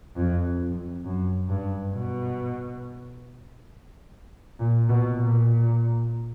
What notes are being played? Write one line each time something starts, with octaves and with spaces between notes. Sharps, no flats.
F2
F2
F#2
G2
B2
A#2
B2
A#2